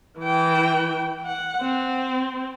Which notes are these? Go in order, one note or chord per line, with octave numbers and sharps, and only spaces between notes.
E3 G5
F#5
C4